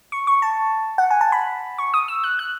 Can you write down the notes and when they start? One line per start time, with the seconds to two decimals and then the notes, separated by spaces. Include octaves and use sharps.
0.12 C#6
0.27 C#6
0.42 A5
0.98 F#5
1.11 G#5
1.21 A5
1.32 B5
1.78 C#6
1.94 D#6
2.08 E6
2.24 F#6
2.39 F#6